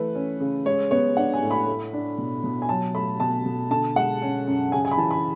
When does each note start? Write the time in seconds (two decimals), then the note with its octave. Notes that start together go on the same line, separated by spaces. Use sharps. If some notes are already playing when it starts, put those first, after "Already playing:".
Already playing: E3 A3 A4 B4
0.15 C#4
0.40 C#3
0.66 G#3 C#5
0.91 B3 C#5
1.17 D4 F#5
1.34 G#5
1.42 A2
1.51 B5
1.67 A3
1.93 D4
2.18 B2
2.44 B2
2.62 G#5
2.69 F#3 A5
2.95 A3 B5
3.20 B2 A5
3.46 B2
3.71 D3 A5
3.96 G#3 F#5
4.22 C#4
4.47 F#2
4.72 C#3 G#5
4.85 G#5
4.91 B5
4.97 E3 A5
5.11 B5